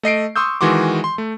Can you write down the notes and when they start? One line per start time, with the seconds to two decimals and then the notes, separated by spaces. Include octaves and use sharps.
0.03 A3 D#5 C7 D7
0.36 C6 C#6 D#6 E6 G6
0.61 D#3 E3 G#3 F#4 C6 D6
1.04 C6
1.18 A3